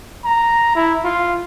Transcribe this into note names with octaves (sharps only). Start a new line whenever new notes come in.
A#5
E4
F4